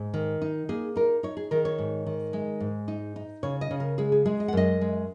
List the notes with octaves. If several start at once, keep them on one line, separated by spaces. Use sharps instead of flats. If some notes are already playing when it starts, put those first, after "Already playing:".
Already playing: G#2
D#3
D#4
A#3 G#4
D#4 A#4
D#4 C#5
G#4
D#3 A#4
C#5
G#2
D#3
G#3 D#5
G#2
D#4
D#4
C#3 C#5
D#5
C#3
A#4
G#3 G#4
G#4
G#3 G#4
D#5
F#5
F#2 D#5
G#3